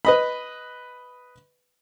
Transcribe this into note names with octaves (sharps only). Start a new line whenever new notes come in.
B4 D#5 B5